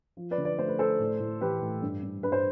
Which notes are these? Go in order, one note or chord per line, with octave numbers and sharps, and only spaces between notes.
F3
B4 D5
D3
B4 D5
A3 C5
B4
A3 A4 C5
A2
A2
E3 G4 B4
A2
G2
G2
G2 B4
C5